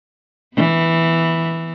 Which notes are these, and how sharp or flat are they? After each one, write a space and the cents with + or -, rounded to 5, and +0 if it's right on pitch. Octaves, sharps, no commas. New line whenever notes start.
E3 -5 B3 +0